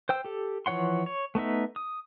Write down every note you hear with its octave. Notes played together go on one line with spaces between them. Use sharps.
C5 G5 E6
G4 A4
E3 F3 C#5 F#5 C6
C#5
A3 B3 D#4 E5
D#6